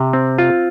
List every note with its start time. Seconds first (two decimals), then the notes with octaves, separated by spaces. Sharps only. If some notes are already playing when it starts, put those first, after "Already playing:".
Already playing: C3
0.13 C4
0.38 F4